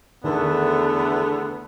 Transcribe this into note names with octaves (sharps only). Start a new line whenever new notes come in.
E2 D3 D#3 A3 B3 A#4